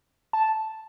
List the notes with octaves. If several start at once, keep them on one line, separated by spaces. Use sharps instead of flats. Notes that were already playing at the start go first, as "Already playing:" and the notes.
A5